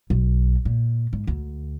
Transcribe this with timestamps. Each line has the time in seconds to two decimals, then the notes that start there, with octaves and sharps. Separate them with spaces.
0.10 B1
0.65 A#2
1.13 G#2
1.27 D2